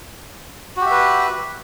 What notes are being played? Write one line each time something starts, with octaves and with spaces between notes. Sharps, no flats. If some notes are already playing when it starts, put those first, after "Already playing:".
F#4 G4 B4 E5